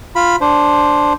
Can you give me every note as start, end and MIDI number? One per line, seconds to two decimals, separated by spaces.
0.16 0.36 65
0.16 0.36 83
0.41 1.13 62
0.41 1.13 72